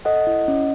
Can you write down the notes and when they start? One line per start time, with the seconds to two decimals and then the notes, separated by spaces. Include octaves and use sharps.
0.05 A4 D#5 F#5
0.27 E4
0.48 C#4